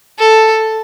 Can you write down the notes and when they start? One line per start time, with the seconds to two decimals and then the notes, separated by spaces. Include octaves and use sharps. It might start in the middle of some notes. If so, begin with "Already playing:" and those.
0.19 A4